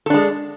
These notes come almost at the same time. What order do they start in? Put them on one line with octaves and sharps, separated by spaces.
A4 D4 G#3